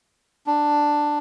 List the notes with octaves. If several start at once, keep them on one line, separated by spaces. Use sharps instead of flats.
D4